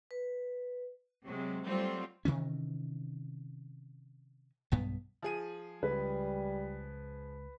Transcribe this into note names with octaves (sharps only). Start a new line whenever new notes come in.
B4
C3 F#3 G#3
F#3 G3 A3 C4 F4
C3 D#3 E3 C#4
B1 G2 B3
F3 G#4 D#7
C#2 G3 B4